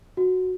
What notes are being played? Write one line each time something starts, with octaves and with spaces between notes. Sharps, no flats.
F#4